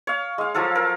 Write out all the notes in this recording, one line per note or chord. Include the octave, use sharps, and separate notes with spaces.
C#5 F5
G#3 F5
F3 F#3 A4 F5
A#4